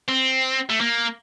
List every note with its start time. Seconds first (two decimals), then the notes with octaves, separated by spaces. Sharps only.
0.08 C4
0.70 A3
0.81 A#3